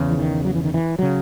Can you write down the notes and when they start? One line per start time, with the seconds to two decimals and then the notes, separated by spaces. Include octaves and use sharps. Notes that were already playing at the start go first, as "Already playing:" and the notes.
Already playing: E2 C#3
0.10 E3
0.18 D#3
0.45 F#3
0.55 E3
0.64 D#3
0.74 E3
0.99 C#3 F#3